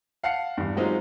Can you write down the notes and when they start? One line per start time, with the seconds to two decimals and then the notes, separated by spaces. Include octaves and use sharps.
0.23 F5 F#5 A5 C7 C#7
0.57 E2 G2
0.76 F#3 G#3 C4 D#4 F4 G4